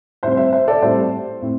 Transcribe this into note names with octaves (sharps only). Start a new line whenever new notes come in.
A2 G3 C4 C5 E5
C5 E5
C5 E5
A4 D5
A2 G3 C4 C5
A2 A3 C4